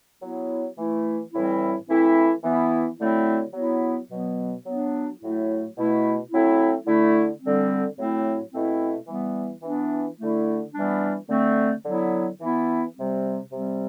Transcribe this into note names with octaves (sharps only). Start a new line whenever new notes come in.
F#3 B3 E4
E3 A3 E4
A2 E3 G3 C4 E4
E3 A3 C4 E4
E3 B3 E4
D3 F#3 A3 C4 E4
F#3 B3 E4
B2 F#3 B3
F#3 B3 D4
A2 F#3 A3 E4
B2 A3 E4
F#3 A3 C4 E4
D3 A3 E4
D3 G3 C4
A2 F#3 A3 C4 E4
B2 A3 C4 E4
E3 G3 B3
E3 B3 D4
D3 A3 E4
E3 G3 B3 D4
D3 A3 C4
D3 F#3 B3 E4
E3 B3 E4
C3 G3 C4
C3 G3 C4